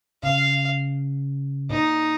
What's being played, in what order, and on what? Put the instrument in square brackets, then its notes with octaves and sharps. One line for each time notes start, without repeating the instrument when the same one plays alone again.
[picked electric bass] C#3 [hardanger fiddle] F5
[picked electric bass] A#2 [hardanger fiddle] D#4